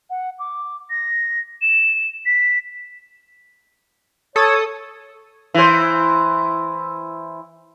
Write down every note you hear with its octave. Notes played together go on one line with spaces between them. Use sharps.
F#5
D6
A#6
E7
B6
A4 C#5 D#6
E3 C5